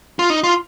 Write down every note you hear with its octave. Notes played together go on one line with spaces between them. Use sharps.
F4
D#4
F4